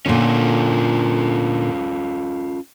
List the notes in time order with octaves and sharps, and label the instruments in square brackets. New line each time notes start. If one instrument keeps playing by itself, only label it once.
[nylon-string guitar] A#2 D3 [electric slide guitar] C#4 F4 A4